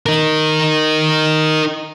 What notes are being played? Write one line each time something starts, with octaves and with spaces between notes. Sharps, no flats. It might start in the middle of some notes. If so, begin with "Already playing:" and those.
D#4 A#4